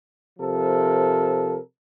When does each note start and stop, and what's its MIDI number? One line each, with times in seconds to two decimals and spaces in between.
0.39 1.57 48
0.39 1.57 53
0.39 1.57 69
0.39 1.57 70